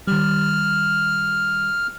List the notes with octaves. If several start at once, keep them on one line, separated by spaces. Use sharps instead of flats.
D#3 G3 F6